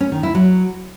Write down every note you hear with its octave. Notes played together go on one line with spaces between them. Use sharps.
C#4
D#3
E4
F#3